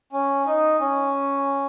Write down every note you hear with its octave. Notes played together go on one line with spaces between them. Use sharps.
C#4
D#4
C#4